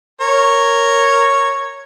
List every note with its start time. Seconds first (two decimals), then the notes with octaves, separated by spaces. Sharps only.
0.21 A#4 C#5